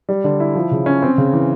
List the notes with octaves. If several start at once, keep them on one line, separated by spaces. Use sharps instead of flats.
G3
D3
E4
F3
C#3
C#4
C4
C#3
E3